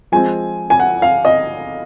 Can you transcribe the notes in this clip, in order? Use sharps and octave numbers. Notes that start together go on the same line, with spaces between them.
F3 G#3 C4 G#5
G#5
F#5
F5
D#5